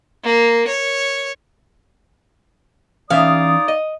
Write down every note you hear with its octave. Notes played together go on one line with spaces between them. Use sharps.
A#3
C#5
E3 C#4 D#4 D5 E5 F5 D#6
D#5